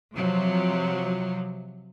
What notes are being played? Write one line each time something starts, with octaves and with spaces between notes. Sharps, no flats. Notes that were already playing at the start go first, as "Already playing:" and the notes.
C3 F3 F#3